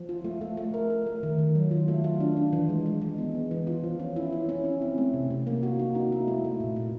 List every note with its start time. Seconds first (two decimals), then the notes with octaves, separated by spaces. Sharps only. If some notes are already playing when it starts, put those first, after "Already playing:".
Already playing: F3
0.09 F4
0.24 A3
0.41 A3
0.57 A3
0.74 A#4
0.90 A#4
1.06 A3
1.23 D#3
1.39 D#3
1.55 F#3
1.71 F4
1.88 A3
2.04 F4
2.20 D4
2.37 D4
2.53 E3
2.69 G#3
2.86 G#3
3.02 G#3
3.18 B3
3.35 B3
3.51 E3
3.67 F4
3.84 F3
4.00 C#4
4.16 E4
4.33 C#4
4.49 C#4
4.65 E4
4.82 C4
4.98 A3
5.14 C3
5.30 C3
5.47 A#3
5.63 F#4
5.79 D#4
5.95 D#4
6.12 E4
6.28 A3
6.44 A3
6.60 A#2
6.76 A#2